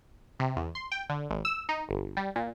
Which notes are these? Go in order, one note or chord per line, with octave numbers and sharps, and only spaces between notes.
C3
E2
C6
G5
D3
G#1
E6
D#4
G1
G3
A#2